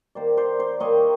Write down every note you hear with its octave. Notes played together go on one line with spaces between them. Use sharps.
D#3 G3 A#3 C5 D5
C5 D5
C5 D5
D#3 G3 A#3 C#5 D#5